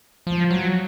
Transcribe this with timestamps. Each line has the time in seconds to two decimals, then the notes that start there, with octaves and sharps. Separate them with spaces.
0.27 F3
0.51 F#3